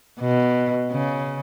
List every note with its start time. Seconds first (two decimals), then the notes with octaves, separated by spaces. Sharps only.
0.21 B2
0.92 C#3